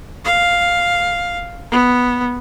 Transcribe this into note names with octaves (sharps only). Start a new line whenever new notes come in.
F5
B3